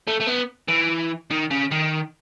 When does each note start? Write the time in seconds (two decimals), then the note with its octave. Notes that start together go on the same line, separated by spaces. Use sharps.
0.08 A3
0.21 A3
0.27 B3
0.68 E3
1.31 D#3
1.51 C#3
1.71 D#3